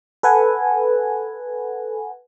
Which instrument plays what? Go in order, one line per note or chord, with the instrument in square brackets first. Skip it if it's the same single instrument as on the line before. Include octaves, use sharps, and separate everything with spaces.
[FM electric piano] A4 B4 F#5 G#5